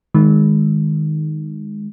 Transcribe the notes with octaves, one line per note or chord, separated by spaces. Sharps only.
D#3 G#3